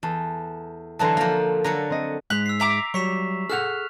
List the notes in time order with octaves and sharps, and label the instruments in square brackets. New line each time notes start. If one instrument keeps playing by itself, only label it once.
[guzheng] E2 [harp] A4
[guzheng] D3 E3 F#3 [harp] A5 A#5 C6
[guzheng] F3 A#3 [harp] A#4 A#5
[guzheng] D3 F#3 A4 [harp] A#5
[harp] C4 D#5
[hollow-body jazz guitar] G#2 G#3 [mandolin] F#6 [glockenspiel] B6 F7
[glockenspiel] E6 C7
[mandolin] E5 A#5 D6
[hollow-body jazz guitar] F#3 G3 C#5 [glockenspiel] C#6 B6 E7
[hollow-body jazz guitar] G#4 A4 F#5 [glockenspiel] F6 F#6 F7